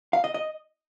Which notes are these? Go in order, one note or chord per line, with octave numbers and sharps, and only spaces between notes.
F5
D#5
D#5